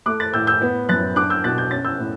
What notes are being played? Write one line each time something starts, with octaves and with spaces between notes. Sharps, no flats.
A3 D6 F#6
F#6 A6
A2 E6 G6
E6 G6
B3
F#2 F#6 A6
D4 D6 F#6
E6 G6
B2 F#6 A6
G6
C#4 A6
E6 G6
A2